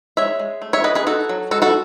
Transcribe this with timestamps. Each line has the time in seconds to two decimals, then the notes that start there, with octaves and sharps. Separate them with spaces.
0.17 G#3 C#5 E5
0.39 G#3
0.62 A3
0.73 C#5 E5
0.84 E3 B4 D#5
0.95 G#4 B4
1.07 D#4 F#4 A4
1.29 F#3
1.51 G#3 F#4 A4
1.62 F#4 A4